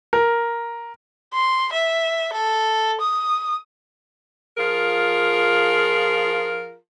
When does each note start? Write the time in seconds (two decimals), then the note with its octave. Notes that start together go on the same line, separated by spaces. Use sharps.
0.13 A#4
1.34 C6
1.72 E5
2.33 A4
3.01 D#6
4.58 F3 F4 G#4 A#4